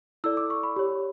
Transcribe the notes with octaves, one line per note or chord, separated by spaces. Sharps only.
E4 A4 D5 E6
D6
C#6
B5
G4 C#5